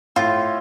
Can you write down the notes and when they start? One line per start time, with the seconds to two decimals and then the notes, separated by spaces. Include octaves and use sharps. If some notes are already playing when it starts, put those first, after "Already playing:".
0.16 A2 F4